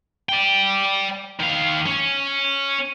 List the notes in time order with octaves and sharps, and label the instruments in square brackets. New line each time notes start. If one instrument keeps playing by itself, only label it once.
[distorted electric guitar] D5 G5
D#3 F5
C#4